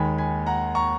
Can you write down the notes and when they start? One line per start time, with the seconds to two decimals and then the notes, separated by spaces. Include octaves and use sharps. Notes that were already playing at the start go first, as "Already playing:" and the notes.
Already playing: D#2 D#3 G#3 G#5 B5
0.18 G#5 B5
0.46 F#5 A#5
0.75 A#5 C#6